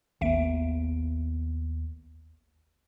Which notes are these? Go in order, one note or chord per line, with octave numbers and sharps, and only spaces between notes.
G#1 D#2 A#3 B3 E5 D7